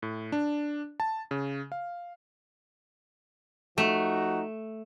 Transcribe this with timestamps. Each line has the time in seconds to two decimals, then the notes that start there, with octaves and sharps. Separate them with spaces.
0.03 A2
0.32 D4
1.00 A5
1.31 C#3
1.72 F5
3.78 F3 A3 D#4 F#4